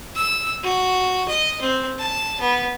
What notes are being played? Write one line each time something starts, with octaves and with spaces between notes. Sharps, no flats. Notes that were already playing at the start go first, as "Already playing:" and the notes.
E6
F#4
D#5
C4
A5
B3